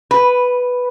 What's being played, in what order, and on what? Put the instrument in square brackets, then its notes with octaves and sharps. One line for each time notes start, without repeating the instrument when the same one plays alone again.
[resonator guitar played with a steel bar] B4